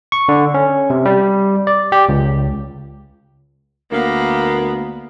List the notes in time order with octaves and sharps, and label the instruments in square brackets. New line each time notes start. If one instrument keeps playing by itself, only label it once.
[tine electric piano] C#6
D3
C#4
C3
G3
D5
G4
C#2
[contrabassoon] D2 [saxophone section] A#3 [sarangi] B3